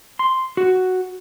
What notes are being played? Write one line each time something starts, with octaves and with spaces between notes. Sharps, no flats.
C6
F#4